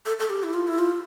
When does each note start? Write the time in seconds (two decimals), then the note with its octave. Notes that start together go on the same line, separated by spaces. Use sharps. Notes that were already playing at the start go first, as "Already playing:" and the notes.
0.06 A4
0.19 A4
0.30 G4
0.43 E4
0.54 F4
0.67 E4
0.79 F4